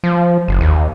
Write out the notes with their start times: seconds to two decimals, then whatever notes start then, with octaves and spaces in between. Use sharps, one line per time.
0.04 F3
0.48 F#1
0.61 D#2